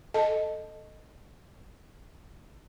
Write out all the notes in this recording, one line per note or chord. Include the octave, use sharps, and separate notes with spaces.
A4 D#5 A5